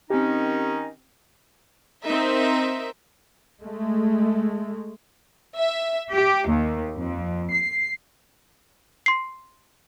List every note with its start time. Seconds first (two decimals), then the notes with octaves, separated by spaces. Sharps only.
0.10 D#3 C4 C#4 D#4 G4
2.04 C4 D#4 A#4 E5
3.63 G#3 A3
5.56 E5
6.12 G4
6.49 D#2
6.96 F2
7.51 C7
9.06 C6 C7